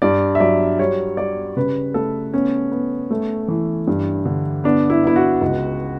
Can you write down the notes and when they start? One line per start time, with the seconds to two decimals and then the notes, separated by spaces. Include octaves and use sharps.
0.02 G2 D5
0.35 E5
0.40 F#3 D5
0.79 G3 C#5
1.17 G3 D5
1.57 C#3 B4
1.94 A3 A4
2.34 B3 C#4
2.72 B3
3.11 A3
3.48 E3
3.87 G2
4.25 D3
4.64 B3 D4
4.90 E4
5.03 B3 E4
5.16 F#4
5.41 C#2